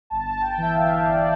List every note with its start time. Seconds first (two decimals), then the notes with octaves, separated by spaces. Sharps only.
0.10 G1 A5
0.41 G5
0.58 E3 E5
0.74 F5
1.05 G1 D5